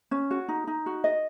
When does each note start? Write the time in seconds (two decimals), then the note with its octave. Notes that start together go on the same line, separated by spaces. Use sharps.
0.11 C#4
0.31 F#4
0.48 D#4
0.67 D#4
0.86 F#4
1.04 D#5